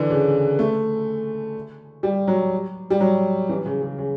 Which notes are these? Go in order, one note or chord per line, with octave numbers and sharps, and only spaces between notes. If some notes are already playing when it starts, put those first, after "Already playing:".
Already playing: D3 E3
C#3
A3
G3
F#3
G3
F#3
E3
C#3
C#3
C#3